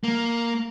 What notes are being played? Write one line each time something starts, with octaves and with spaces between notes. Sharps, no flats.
A#3